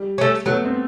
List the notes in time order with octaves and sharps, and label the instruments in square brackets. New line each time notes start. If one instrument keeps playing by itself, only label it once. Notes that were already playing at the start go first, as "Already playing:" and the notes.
Already playing: [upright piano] G3
[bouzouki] A3 C#4
[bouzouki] F#3 [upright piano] A3 B3
[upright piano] C4